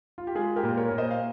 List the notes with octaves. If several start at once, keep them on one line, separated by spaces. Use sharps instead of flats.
F4
G4
G#3 F4 G#4
G4 A#4
A#2
A#4 C#5
A#2
C5 D#5
F5